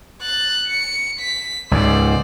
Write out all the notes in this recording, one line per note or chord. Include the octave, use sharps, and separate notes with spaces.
F#6 A6
C#7
B6
C#2 G#2 C5 D5